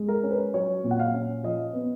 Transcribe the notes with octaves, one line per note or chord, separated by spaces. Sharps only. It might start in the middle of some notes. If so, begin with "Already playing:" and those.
Already playing: G#3
A#4
C#4
B4
F#3 C#5
A#2
F#5
F5
C#4
F3 D#5
B3